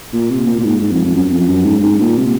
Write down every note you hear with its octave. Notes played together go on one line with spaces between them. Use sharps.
A#2
C3
A#2
A#2
G#2
G#2
F2
F2
F#2
F2
F#2
G#2
G#2
A#2
C3